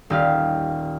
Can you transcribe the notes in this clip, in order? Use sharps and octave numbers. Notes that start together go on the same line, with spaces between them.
D#1 G4 F5